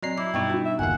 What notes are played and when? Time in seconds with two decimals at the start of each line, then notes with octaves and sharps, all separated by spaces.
0.03 F#3 C4 D5 D#5 A#5 C7
0.18 E4 D6
0.34 G2 B2 D#4 G5 C#6
0.50 D4 F4 F#4
0.65 E5
0.79 G1 D#2 D3 F5 F#5 G#5